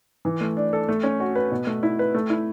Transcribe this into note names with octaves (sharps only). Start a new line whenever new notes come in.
E3
A3
D4
A4
A3
C#4
F#4
B4
B2
A3
E4
B4
A3
E4